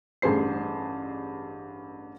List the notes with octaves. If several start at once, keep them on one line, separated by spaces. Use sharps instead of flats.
A1 G2 G#4 C5 C7